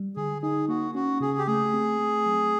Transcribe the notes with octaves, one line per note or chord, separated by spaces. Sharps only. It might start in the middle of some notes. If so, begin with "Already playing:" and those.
Already playing: G3
D3 G#4
D#4 G#4
A#3 F#4
C#4 F#4
C#3 G#4
G4
A3 G#4
C4
A3
F#3